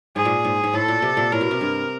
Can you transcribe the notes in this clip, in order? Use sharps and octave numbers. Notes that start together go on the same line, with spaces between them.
G#2 G#4
A#2
G#2
G#2
A2 A4
A#2
C3
A#2
A2 A#4
B2
C3
G2